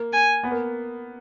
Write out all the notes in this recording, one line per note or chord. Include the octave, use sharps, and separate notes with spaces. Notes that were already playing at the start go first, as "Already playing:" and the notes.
Already playing: A#3
G#5
B3
A#3